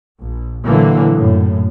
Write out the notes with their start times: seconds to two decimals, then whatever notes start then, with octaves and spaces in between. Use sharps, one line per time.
0.19 A#1
0.65 A#2 D3 E3 F#3 A#3
1.14 F#2 A2